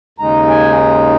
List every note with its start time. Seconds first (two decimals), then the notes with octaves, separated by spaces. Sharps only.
0.19 D#2 C#3 G#3 D#4 A#5
0.50 G#5